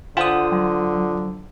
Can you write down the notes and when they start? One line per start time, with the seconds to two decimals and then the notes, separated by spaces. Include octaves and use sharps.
0.17 D3 F4 C5 F#5 D#6
0.52 F#3